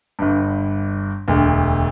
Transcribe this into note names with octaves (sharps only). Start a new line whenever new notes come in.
G1 G2
E1 D2